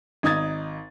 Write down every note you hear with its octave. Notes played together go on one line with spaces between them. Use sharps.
G#1 D#4 D#6 G#6 A6